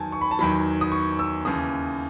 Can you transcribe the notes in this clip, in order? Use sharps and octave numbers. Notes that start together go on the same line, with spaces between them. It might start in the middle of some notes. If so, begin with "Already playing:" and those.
Already playing: E2 D#3 F#3 G#5 A5
C#6
B5
A5
E2 D#3 F#3 B5
D#6
C#6
E6
D#2 C#3 E3 D#6